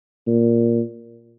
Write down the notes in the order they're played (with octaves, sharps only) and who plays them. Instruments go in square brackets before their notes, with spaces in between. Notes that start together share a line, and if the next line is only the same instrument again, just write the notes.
[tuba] A#2